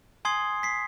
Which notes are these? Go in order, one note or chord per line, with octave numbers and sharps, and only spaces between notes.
G#5 C6 D#6 G#6 C7 G7
B6 C7